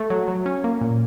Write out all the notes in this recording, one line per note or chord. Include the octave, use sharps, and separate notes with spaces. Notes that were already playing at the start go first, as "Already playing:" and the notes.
Already playing: A3
F#3
F#3
C#4
A#3
A#2